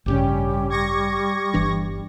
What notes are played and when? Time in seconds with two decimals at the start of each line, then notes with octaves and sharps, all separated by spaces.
0.06 A1 G2 C#3 G3 C#4 G4
0.70 C#6 G#6 A#6
1.54 G1 E3 D4